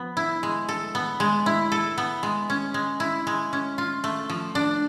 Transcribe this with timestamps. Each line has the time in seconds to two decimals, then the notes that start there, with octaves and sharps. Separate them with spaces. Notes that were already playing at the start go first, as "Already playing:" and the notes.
Already playing: F3 B3
0.17 E4
0.43 G#3
0.69 A4
0.95 B3
1.20 G#3
1.46 E4
1.72 A4
1.98 B3
2.23 G#3
2.50 C#4
2.74 G#3
3.00 E4
3.27 G#3
3.53 C#4
3.78 F4
4.04 A3
4.30 F3
4.55 D4